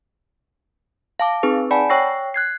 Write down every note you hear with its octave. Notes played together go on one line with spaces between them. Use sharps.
F5 A5 D6
C4 D#4 G#4 B4
D5 F#5 G#5 A5 B5
C#5 G5 C#6 E6 A#6 C7
F#6 G#6 C7